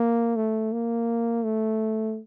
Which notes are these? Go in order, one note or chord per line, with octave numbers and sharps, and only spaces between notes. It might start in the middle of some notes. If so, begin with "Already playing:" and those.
Already playing: A#3
A3
A#3
A3